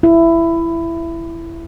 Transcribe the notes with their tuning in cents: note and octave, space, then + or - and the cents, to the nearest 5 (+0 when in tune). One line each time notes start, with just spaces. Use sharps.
E4 +15